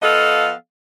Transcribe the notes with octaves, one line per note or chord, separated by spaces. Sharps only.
F3 B3 A4 D#5 F5